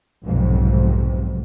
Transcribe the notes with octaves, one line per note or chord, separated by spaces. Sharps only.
F1 B1 F2 G#2 C3